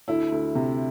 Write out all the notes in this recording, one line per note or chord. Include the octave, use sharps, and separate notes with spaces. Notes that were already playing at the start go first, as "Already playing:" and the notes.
D2 E4
D2
C3